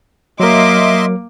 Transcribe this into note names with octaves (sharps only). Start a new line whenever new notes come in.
F#3 A#3 A#4 D#5 E5 C6 D6